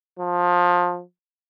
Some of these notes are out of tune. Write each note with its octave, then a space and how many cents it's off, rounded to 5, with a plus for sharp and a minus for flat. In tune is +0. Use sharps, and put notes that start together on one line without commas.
F3 +20